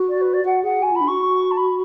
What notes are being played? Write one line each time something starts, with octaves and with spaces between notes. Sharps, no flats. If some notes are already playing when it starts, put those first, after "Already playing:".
Already playing: F#4
D5
B4
D5
F#4 F#5
G#4 F#5
F#4 G#5
F4 B5
D4
F#4 C#6
A5
B5